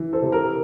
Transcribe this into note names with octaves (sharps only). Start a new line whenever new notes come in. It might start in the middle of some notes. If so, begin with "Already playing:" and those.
Already playing: E3
A4 C5
C3
A#4